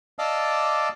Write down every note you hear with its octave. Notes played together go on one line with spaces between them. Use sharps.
D5 D#5 F5 A5 D6 E6